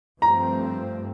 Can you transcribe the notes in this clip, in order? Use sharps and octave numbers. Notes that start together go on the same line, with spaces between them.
G2 F3 A3 C4 A#5